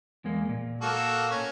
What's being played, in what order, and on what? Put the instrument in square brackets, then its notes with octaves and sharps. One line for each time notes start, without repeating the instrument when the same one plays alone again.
[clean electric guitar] E2 G#3 A#3
A#2
[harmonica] A#3 F#4 A4
C#4